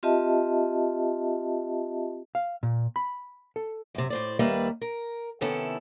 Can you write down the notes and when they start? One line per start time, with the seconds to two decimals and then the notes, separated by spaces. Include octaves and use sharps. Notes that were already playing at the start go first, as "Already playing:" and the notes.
0.03 C4 F4 G4 D#5 E5 A5
2.35 F5
2.63 A#2
2.96 B5
3.56 A4
3.95 F#2 C3
4.10 A2 C5 D5
4.39 D#2 G3 A#3 B4 E5 F5
4.81 A#4
5.41 C3 D#3 B3 C#4 E4 A4